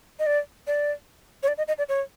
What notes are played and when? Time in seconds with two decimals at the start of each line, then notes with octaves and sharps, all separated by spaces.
0.19 D#5
0.26 D5
0.67 D5
1.43 C#5
1.48 D5
1.58 D#5
1.68 D#5
1.78 D5
1.89 C#5